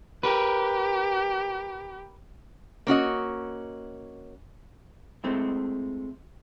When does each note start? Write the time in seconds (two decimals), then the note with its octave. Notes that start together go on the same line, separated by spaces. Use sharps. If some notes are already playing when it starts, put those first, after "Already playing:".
0.23 G4 A#4 B4
2.87 A#3 C#4 F#4 D#5
5.24 G#3 A3 C4 E4